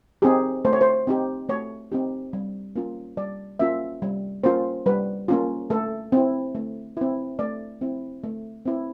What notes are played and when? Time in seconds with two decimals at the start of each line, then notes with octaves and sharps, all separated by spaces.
0.22 C4 D#4 G4 G#4
0.65 A3 C5
0.73 C#5
0.81 C5
1.07 C4 D#4 G4
1.49 A3 C#5
1.92 C4 D#4 G4
2.33 G3
2.76 A#3 C#4 F4
3.17 G3 D5
3.59 A#3 C#4 F4 E5
4.02 G3
4.44 A#3 C#4 F4 C5
4.86 G3 B4
5.28 A#3 C#4 F4
5.70 A3 A4
6.12 C4 E4
6.55 A3
6.97 C4 E4
7.39 A3 D5
7.81 C4 E4
8.24 A3
8.66 C4 E4